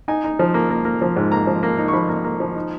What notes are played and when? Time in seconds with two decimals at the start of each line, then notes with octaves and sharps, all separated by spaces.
0.08 D#4 G#5
0.24 D#4
0.39 F3
0.54 A#3
0.70 A#3
0.85 A#3
1.02 F3
1.16 G#2
1.32 A#3 A#5
1.47 F3
1.63 A#3
1.78 D#4
1.88 C#6
1.93 F3 B5
2.09 A#3
2.24 A#3
2.40 F3
2.56 D#4